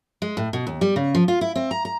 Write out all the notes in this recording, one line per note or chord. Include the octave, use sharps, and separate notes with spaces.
G#3
A2
B2
D#2
G3
C#3
F3
F4
E4
C4
A#5
A#5